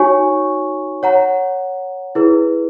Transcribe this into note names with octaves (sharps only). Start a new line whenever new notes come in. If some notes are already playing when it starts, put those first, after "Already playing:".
Already playing: D#4 F#4 C#5 G#5 C#6
C#5 F#5 A#5
E4 G#4 B4